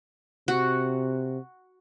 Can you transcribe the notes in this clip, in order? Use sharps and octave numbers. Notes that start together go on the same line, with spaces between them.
C3 F#4